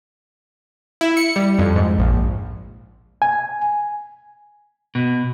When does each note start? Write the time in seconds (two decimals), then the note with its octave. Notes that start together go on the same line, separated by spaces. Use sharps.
1.01 E4
1.17 C#7
1.36 G3
1.59 F2
1.76 G#2
1.98 A#1
3.22 G#5
4.95 B2